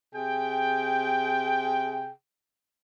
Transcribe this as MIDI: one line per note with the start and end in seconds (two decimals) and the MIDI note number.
0.15 2.12 48
0.15 2.12 68
0.15 2.12 79